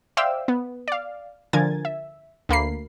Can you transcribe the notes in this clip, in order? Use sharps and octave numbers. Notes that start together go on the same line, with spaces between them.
C5 D5 E5 F5 G5 E6
B3
D5 F5
D3 F3 A#4 G#5 G#6 A6
E5
D2 A#3 B5 C7